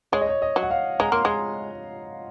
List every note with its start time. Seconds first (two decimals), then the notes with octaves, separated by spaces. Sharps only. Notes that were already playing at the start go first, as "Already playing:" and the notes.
0.12 G#3 C#5
0.21 D#5
0.29 C#5
0.42 D#5
0.56 F#3
0.63 F#5
0.71 F5
1.00 G#3 A#5
1.12 A#3 C6
1.25 G#3 A#5